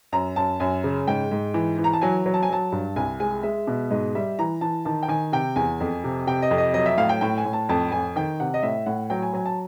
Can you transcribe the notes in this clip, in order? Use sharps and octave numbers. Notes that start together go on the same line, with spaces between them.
F#2 A#5
F#2 A5
F#2 G#5
C#3
G#2 G5
G#2
E3
E3
A#5
A5
F#3 G#5
F#3
A5
G#5
F#3 A5
G2
C2 G#5
G#3 G#5
G#3 E5
B2
G#2 D#5
G3 E5
E3 A#5
E3 A5
D#3 A5
G5
D#3 G#5
C3 G5
E2 G#5
F2
C3
C3 G5
D#5
F2
D#5
F#3 D#5
E5
A2 F5
G5
A2 G5
G#5
A2
A5
F2 A5
F2 G#5
D#3 G5
C3 F#5
D#5
A2 E5
A2 F#5
F#3 G5
G#5
F#3 G#5
A5